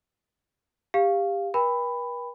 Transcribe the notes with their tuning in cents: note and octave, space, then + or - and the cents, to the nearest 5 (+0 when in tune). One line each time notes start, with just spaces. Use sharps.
G4 +20 F5 +0
B4 -45 G5 +35 B5 +10